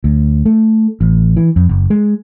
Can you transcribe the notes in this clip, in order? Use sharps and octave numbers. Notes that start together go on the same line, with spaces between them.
D2
A3
A1
E3
F2
F#1
G#3